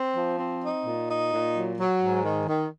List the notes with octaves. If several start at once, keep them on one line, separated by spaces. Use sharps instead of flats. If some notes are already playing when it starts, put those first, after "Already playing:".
Already playing: C4
F3
C4
D#4
A#2
D#4
A#2
F#3
F#3
G#2
D#3
D#3